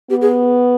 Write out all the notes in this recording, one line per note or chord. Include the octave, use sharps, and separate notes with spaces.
B3 G4
G#4